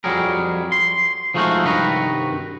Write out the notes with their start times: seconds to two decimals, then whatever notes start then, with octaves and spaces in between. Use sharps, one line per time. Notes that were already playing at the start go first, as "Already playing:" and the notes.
0.04 F2 F#3 G3 G#4 A#4
0.72 C6
1.34 F3 G#3 A3 D#4 F4 F#4
1.64 C2 G2 D#3 F#4 B4 A#5